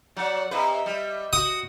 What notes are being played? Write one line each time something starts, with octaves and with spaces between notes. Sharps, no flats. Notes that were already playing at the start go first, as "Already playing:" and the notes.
F#3 D5 F#5
C3 B4 D#5 E5
G3
F#4 D#6